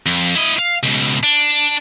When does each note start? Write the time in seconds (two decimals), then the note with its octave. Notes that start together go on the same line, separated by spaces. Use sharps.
0.06 F2
0.35 E4 D#5
0.59 F5
0.83 C#2 B2
1.23 D4